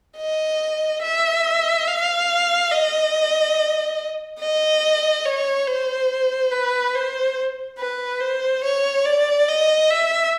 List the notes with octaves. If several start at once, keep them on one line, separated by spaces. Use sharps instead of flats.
D#5
E5
F5
D#5
D#5
C#5
C5
B4
C5
B4
C5
C#5
D5
D#5
E5